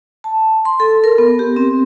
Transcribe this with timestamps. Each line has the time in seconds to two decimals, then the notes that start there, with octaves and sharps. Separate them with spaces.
0.24 A5
0.65 C6
0.80 A4
1.04 A#4
1.18 B3
1.39 G4
1.56 C4